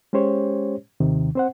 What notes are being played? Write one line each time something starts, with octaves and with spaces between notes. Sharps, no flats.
G#3 C#4 G4 C5 C#5
D#2 C3 D#3
C4 C5 F#5